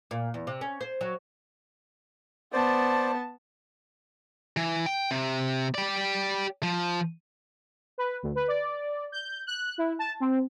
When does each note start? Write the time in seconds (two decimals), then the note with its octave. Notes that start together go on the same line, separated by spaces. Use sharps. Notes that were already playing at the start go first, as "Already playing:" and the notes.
0.11 A#2
0.34 E2
0.47 C3
0.61 C#4
0.81 C5
1.01 F#3
2.53 B3 C5 D5 A5
4.57 E3
4.86 G5
5.11 C3
5.75 G4 D5
6.63 F3
7.98 B4
8.23 D2
8.35 B4
8.48 D5
9.12 G6
9.47 F#6
9.78 E4
9.99 A5
10.20 C4